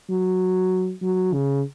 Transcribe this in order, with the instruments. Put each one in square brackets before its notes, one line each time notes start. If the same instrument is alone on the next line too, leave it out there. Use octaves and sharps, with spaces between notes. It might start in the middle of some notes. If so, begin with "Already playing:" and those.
[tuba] F#3
F#3
C#3